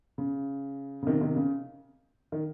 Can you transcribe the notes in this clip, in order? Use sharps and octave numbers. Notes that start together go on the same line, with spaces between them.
C#3
C#3
C3 D#3
C3 D#3
C#3
D#3